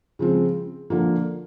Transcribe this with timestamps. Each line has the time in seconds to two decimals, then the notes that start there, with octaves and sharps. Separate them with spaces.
0.19 C#3 F3 G#3 C4
0.90 D3 F3 A#3